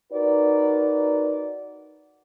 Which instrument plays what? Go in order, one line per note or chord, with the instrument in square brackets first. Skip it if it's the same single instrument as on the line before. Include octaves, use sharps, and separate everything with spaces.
[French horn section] D#4 F#4 A#4 B4 D5